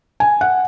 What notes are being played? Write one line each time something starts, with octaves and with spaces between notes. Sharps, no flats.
G#5
F#5